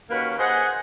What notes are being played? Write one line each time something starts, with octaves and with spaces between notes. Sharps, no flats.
D#2 A#3 C#4 F#4 B4
G#4 C5 D#5 F#5